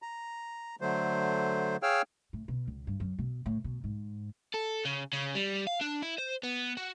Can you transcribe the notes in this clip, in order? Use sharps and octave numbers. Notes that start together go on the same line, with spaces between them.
A#5
D3 F#3 A3 C5
G#4 C#5 F5 G5 E6 F6
A2
B2
C#2
G2
F#2
B2
A2
B2
G#2
A4
C#3
C#3
G3
F5
D4
E4
C5
B3
F#4